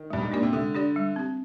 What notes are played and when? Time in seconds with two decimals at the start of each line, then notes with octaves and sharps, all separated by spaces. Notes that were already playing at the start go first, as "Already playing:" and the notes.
Already playing: D#3
0.10 G2 G#3
0.23 G#2
0.32 A#2 D4 G4 D5
0.43 C3
0.53 D3 G#3
0.74 D4 G4 D5
0.96 G3
1.16 C4 G4